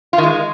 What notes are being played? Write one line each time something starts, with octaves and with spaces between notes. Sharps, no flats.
F4
D#3
G#3